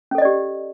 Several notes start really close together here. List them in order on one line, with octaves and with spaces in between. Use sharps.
C#4 A4 D#5 D5 G4